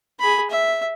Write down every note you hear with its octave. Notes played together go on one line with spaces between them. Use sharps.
G#4 B5
E5